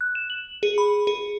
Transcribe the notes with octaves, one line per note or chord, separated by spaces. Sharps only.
F#6
E7
F#7
G#4
B5
G#4